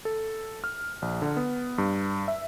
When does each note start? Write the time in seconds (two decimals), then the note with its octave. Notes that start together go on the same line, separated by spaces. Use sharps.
0.05 A4
0.64 F6
1.02 A#1
1.22 D3
1.37 B3
1.78 G2
2.28 E5